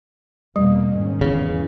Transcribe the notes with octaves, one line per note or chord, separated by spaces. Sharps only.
E2 B2 G3 A#3
G#2 D#3 C#4
E2 C#3